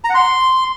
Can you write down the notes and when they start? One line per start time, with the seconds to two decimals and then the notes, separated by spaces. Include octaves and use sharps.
0.04 A#5
0.09 F#5
0.15 C6